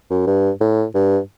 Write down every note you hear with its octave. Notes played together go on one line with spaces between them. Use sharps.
F#2
G2
A2
G2